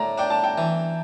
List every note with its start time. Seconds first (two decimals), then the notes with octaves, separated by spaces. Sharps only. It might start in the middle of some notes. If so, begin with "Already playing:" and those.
Already playing: A2 D5 A#5
0.18 D4 G5
0.30 A5
0.44 G5
0.58 E3